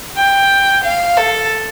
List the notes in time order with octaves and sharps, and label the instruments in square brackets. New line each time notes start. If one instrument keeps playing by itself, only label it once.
[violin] G5
F5
A4